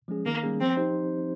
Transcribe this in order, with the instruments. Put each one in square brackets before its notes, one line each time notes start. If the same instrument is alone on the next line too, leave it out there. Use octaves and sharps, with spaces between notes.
[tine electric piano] F3 G#3 C#4 G#4
[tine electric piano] D#3 [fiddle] A#3
[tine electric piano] G3 A#3 C#4 G#4
[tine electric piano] F3 [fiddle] C4
[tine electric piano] C4 D#4 G4 C5